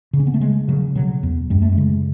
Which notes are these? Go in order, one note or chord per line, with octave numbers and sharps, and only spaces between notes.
C#3
C#4
B3
A3
C#3 G#3
C#3 F#3
B2 F#3
E2
F#2 G#3
A3
G#3
C#3